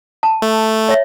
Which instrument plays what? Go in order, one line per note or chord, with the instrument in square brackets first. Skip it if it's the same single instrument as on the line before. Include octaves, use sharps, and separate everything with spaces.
[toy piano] A5
[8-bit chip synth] A3
[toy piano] C#5 E5